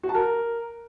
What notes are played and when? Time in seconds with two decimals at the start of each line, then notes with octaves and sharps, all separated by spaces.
0.03 F#4
0.09 A5
0.15 A#4